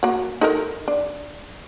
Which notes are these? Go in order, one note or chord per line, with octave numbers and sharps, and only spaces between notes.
A#3 F#4
D#4 A4 A#4
D4